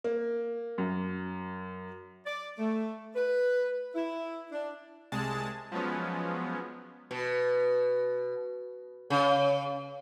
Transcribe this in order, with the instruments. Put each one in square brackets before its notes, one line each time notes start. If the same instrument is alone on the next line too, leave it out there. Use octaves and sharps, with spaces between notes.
[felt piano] A#3
F#2
[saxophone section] D5
A3
B4
E4
D4
[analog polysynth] C2 C3 G#3 G#4 A5
F3 F#3 G#3 B3 C#4
[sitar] B2
C#3